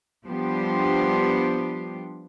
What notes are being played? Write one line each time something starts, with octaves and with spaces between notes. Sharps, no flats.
F3 G3 B3 D4 G4 C5